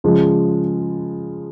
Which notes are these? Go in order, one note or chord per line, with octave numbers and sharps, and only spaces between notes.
C#3 F3 G#3